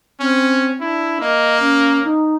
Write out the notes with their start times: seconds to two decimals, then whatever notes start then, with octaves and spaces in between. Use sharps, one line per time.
0.20 C4 C#4
0.80 D4 E4
1.21 A#3 D#5
1.60 C#4
2.04 D#4